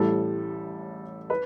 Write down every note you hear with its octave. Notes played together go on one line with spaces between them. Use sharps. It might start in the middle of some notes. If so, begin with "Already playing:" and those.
Already playing: A1 A2 G3 A4
B4